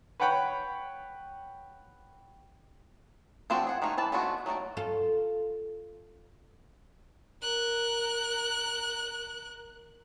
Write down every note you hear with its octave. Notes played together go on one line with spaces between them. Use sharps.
B4 C#5 F#5 G5 B5
F3 G3 C4 D4 F#4
G#4 F#5
D#3 G#3 A3 D#4
E3 B4 A5
G#3 A3 B3 D4 F#4
F#3 A3 D#4 D5
F4 A4
A#4 F#6